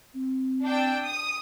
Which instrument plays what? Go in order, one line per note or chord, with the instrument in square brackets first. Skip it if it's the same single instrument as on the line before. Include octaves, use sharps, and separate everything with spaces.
[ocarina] C4
[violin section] D4 G5 E6
D#6